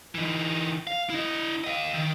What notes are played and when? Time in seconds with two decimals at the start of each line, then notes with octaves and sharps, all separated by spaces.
0.15 E3 D#4
0.87 F5
1.10 E4 D#5
1.64 D#5 F5
1.94 D#3